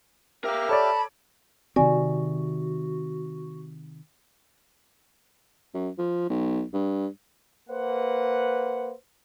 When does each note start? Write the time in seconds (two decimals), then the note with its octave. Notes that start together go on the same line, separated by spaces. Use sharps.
0.44 G4 A#4 E5 F5 F6
0.69 A4 C#5 D5 A5 B5
1.76 C3 D#3 C4 F#4 D5 G#5
5.74 F#2
5.98 F3
6.29 B1
6.73 G2
7.70 A#3 B4 C5 F#5